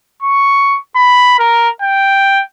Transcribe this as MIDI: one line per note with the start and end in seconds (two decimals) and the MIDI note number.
0.22 0.79 85
0.96 1.38 83
1.39 1.69 70
1.82 2.43 79